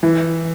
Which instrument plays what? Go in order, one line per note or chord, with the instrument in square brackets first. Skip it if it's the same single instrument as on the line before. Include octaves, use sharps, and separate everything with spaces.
[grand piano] E3